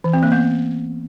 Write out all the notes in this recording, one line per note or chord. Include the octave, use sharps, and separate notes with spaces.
E3
C4
A#3
B3